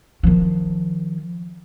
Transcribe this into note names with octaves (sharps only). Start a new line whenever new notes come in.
D#3 F3